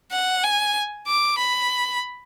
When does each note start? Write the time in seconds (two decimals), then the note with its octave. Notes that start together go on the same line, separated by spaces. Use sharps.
0.11 F#5
0.43 G#5
1.07 D6
1.39 B5